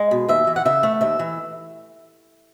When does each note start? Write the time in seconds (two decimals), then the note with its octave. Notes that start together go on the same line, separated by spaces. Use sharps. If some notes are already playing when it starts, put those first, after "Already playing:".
Already playing: G#3
0.11 B2
0.29 D#2 E5
0.47 E3
0.56 F#5
0.65 C#3 E5
0.83 A3
1.01 D#2 E5
1.19 E3